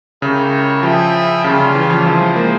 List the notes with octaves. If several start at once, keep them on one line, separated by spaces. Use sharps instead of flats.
C#3 G#3 E4 G4 A#4 C#5
F3 E4 G#4 E5 G5
C#3 G3 A#3 C#4 F4
C#3
E3
F3
F3 G3 C4 E4 G#4 C5
G#3
A#3